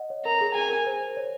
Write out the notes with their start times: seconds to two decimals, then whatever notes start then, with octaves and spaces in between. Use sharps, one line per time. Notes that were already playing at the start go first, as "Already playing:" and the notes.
Already playing: D#5 F#5
0.10 C#5
0.25 A#4 A#5
0.41 G#4
0.55 G#4 G#5
0.70 A#4
0.87 C5
1.17 C#5